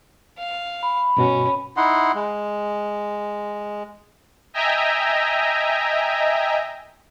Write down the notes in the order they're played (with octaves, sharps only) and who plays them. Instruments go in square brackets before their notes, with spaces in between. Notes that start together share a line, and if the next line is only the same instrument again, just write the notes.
[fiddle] F5
[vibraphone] B5
[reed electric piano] G2 B2 F#4 [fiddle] C#4
[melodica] D#4 E4 F#5 C6
G#3
[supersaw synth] D#5 E5 G5 G#5 A#5